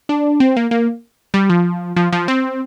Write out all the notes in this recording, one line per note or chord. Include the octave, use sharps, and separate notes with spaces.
D4
C4
A#3
A#3
G3
F3
F3
F3
C4